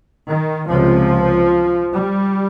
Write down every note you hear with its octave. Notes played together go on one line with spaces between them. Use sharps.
D#3
C#2 C3 F3
G3